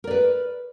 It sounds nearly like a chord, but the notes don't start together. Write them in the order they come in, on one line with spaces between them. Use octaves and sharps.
A#4 D5 B4